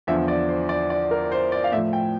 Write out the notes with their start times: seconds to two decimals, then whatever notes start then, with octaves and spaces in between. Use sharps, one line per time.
0.07 E2 D3 F3 E5
0.28 D5
0.49 C5
0.69 D5
0.90 D5
1.11 A#4
1.32 C5
1.52 D5
1.64 F5
1.72 A2 E5
1.77 F3
1.93 G5